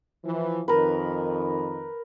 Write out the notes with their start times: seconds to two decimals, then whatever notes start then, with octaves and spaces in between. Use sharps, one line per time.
0.24 E3 F3
0.68 F2 D#3 A#4 B4